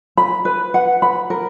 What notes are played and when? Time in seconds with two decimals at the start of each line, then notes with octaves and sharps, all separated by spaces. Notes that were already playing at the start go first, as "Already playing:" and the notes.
0.17 B5
0.45 B4
0.74 F#5
1.02 B5
1.30 A#4